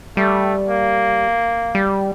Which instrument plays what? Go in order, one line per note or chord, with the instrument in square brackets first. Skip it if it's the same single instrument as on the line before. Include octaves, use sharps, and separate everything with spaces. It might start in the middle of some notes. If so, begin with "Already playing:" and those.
[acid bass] G3 [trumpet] A3
[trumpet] A#3
[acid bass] G3